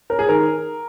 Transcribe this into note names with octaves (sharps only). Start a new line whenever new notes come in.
C#4 A#4
G#4
D#3 A#4